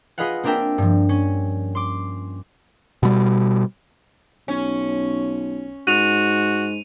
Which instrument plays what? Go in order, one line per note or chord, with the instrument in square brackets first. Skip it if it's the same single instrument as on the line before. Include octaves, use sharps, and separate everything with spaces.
[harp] F4 G#4 B4 D#5 F5 F#5
A#3 C4 D4 A#4 E5 G5
G2 F3
C#4
C6 D6
[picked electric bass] B2 G3
[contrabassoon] B1 [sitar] C#4
[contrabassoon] G#2 [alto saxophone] F#4 [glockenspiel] D#7 F7